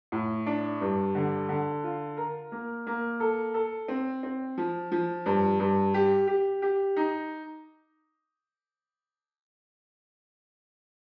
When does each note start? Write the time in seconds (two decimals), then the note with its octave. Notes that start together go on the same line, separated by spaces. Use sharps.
0.12 A2
0.46 D4
0.81 G2
1.15 D3
1.49 D3
1.84 F4
2.17 A#4
2.52 A#3
2.87 A#3
3.20 A4
3.54 A4
3.88 C4
4.23 C4
4.58 F3
4.92 F3
5.26 G2
5.60 G2
5.94 G4
6.27 G4
6.62 G4
6.96 D#4